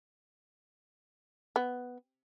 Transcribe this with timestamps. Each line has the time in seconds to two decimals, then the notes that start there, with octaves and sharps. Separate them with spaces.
1.56 B3